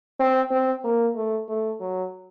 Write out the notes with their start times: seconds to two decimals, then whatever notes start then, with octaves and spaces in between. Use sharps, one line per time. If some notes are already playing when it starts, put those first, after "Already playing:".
0.20 C4
0.51 C4
0.84 A#3
1.16 A3
1.49 A3
1.80 F#3